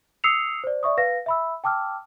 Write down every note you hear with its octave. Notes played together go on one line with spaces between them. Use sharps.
D#6 E6 C7 C#7 F7
C5 D5
D5 E5 C#6 D#6
B4 F5 A#6
E5 B5 E6
G5 A5 D6 E6 F6